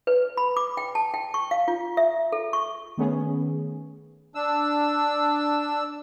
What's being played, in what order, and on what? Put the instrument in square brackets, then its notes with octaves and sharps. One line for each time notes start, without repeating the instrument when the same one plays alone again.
[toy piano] B4
B5
D6
G5
A5
G5
C#6
F5
F4
E5
A4
C#6
[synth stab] D#3 A3 B3 C#4 G#4
[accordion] D4 E6